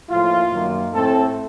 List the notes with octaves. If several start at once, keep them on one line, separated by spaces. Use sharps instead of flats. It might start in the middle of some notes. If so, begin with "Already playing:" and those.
A2 F3 A#3 F4
F#2 D#3 A#3
A2 A3 C4 A4